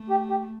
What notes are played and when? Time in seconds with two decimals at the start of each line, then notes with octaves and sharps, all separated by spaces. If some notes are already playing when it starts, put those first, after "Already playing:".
Already playing: A3
0.10 G4
0.30 G4